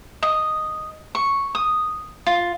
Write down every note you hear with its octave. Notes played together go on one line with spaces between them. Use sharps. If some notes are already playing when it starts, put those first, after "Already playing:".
D#5
C#6
D#6
F4